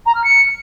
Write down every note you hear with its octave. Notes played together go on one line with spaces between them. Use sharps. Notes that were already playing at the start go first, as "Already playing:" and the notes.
A#5
F6
C#7